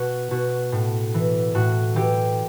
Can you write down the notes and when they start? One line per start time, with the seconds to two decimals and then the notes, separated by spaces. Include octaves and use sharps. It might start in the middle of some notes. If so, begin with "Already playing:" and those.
Already playing: B2 F#4
0.31 B2 F#4
0.72 A2
1.14 E3
1.55 A2 F#4
1.96 E3 G4